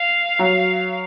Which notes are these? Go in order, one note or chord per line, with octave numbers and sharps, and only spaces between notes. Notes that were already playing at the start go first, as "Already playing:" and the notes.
Already playing: F5
F#3